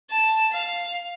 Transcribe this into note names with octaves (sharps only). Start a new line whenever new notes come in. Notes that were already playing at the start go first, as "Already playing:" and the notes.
A5
F5